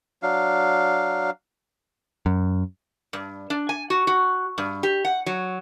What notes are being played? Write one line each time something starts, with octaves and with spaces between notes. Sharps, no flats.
F#3 D4 F5
F#2
G2
D4
G#5
F#4
F#4
G2
G4
F#5
F#3